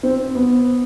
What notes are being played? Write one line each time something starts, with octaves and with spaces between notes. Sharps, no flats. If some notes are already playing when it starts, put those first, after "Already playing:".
C4
B3